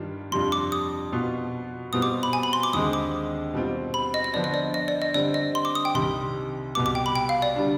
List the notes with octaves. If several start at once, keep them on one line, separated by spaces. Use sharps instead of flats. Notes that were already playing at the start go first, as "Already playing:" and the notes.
Already playing: G2 D#3 G3 D4 F4
F2 C3 G3 D4 F4 C6
D6
D#6
B2 B3 F4
B2 G3 C4 F4 D#6
D6
B5
G#5
B5
C6
D6
D#2 D3 G#3 C4 D#6
D6
B2 G3 C4 F4
B5
D#5
D#5
D3 F3 B3 D4 D5
D#5
D5
D#5
D5
D#5
D3 G3 C4 D5
D#5
C6
D6
D#6
G5
C2 C3 D#3 G3 C6
C2 B2 G3 D6
D6
G5
B5
G5
F5
D5
D3 G3 D4